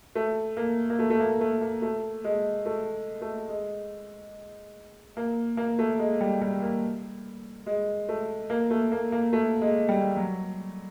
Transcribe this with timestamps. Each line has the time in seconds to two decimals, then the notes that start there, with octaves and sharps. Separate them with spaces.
0.15 A3
0.57 A#3
0.90 A#3
0.99 A3
1.10 A3
1.20 A#3
1.41 A3
1.61 A#3
1.82 A3
2.24 G#3
2.66 A3
3.22 A3
3.49 G#3
5.17 A#3
5.57 A#3
5.79 A3
5.99 G#3
6.21 G3
6.41 G3
6.62 A#3
7.66 G#3
8.09 A3
8.50 A#3
8.70 A3
8.92 A#3
9.12 A#3
9.33 A3
9.61 G#3
9.89 G3
10.17 F#3